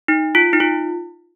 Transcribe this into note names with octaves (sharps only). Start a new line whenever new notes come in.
D#4
F4
D#4
F4